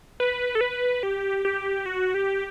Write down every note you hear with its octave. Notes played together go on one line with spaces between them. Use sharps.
B4
A4
B4
G4
G4
F#4
G4